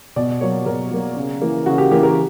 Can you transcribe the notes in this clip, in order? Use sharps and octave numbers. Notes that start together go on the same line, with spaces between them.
B2 D5
F#3 A#3 C#5
B2 A#4
F#3 A#3
C#3
E3 A#3
C#3 F#4
G4
E3 A#3 G4
A#4